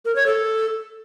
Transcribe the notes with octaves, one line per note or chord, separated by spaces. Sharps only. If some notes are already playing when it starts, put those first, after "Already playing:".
A#4
C#5
A4